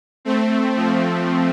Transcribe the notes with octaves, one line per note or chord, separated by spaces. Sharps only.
A3 C4
F3 A3